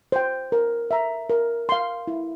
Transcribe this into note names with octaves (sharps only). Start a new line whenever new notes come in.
C5 G5
A#4
E5 A#5
A#4
F5 C6
E4